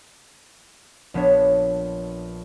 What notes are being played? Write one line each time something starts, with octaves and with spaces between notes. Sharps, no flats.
A#1 B3 D4 C#5